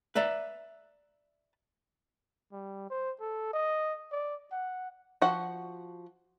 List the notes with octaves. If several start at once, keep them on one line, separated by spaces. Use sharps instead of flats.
B4 D5 E5 A#5
G3
C5
A4
D#5
D5
F#5
F3 F#4 F#5